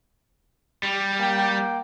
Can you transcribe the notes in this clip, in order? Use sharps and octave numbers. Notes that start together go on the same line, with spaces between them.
G3
A#3 G5